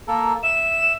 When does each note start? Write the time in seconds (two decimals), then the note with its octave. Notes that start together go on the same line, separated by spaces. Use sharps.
0.08 A#3 A4 A#4
0.43 E5 E7